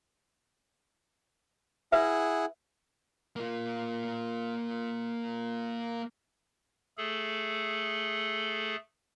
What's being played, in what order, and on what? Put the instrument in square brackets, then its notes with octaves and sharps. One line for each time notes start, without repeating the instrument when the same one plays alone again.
[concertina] E4 G#4 F#5 [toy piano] B4 E5
[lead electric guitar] A#3 F4
[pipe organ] A3 G#4 A4